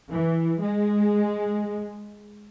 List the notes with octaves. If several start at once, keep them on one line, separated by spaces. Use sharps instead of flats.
E3
G#3